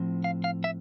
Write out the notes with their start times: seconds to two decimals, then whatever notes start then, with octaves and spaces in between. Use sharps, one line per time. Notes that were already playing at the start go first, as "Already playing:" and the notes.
Already playing: A2 F3 C4
0.24 F5
0.44 F5
0.64 E5